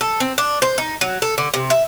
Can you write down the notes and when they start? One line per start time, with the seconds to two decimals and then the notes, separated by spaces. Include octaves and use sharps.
0.01 A4
0.20 C4
0.38 D4
0.62 C5
0.78 D#4
1.01 F#3
1.22 A4
1.38 D3
1.54 C3
1.70 E5